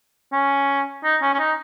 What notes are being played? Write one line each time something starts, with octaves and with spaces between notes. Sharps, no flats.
C#4
D#4
C#4
C#4
D#4